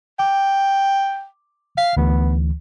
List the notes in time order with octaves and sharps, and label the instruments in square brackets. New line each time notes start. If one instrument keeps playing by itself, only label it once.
[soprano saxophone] G5 [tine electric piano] D6
[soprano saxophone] F5 [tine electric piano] B6
[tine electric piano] D2 E3 [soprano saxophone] B3